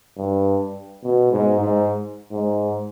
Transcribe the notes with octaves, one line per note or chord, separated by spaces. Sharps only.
G2
B2
G#2
G#2
G#2